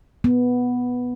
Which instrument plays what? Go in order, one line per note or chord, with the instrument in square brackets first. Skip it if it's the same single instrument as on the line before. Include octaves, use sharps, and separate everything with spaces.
[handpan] B3